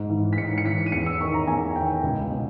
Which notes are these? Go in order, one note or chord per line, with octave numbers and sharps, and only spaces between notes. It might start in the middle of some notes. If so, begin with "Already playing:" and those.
Already playing: G#2
E3
B6
G#2 C#7
C#7
E3 B6
D#7
E2 C#7
E6
D#3 C#6
A#5
E2 G#5
D#3 G5
C#2
B2